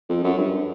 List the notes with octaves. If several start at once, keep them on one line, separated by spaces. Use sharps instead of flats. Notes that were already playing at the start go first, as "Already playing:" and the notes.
F2
F#2
G2